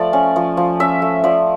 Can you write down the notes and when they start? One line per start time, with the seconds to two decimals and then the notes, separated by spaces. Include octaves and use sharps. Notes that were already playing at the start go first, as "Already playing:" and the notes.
Already playing: F3 A3 D5
0.13 C#4
0.36 F3
0.57 F3
0.80 C#4 E5
1.02 A3
1.24 F3 D5